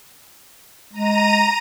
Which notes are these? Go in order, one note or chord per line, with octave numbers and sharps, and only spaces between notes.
G#3 A#5 D#7